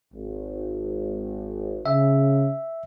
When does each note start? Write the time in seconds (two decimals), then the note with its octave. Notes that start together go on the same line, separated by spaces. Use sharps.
0.14 G#1
1.86 C#3 E5